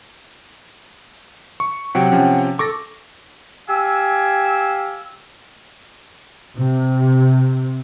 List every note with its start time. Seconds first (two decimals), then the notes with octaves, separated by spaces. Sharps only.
1.60 C#6
1.95 C3 F#3 F#5 G5
2.12 C3 F3 C#4
2.59 A4 C#6 D6 A6 A#6
3.69 G4 F5 G#5 E6
6.58 C3